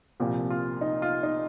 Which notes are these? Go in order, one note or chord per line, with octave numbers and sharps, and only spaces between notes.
C2 A#2 F3 G4
F4
D#4
F4
D#4